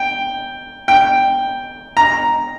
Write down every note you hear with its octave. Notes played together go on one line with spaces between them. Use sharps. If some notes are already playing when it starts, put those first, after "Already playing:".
Already playing: G5
G5
A#5